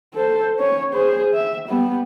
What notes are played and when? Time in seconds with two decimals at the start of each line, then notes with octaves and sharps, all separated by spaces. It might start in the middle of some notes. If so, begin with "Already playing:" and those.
0.14 A4 C5
0.59 C#4 C#5
0.93 G#4 C5
1.34 E5
1.68 G3 B3